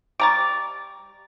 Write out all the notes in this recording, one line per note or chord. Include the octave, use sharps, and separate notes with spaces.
G3 A#5 C#6 D6 A6